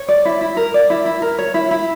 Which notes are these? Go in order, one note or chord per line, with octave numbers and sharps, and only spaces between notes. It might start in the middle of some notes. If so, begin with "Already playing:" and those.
Already playing: C#5
D5
E4
E4
A#4
D5
E4
E4
A#4
C#5
E4
E4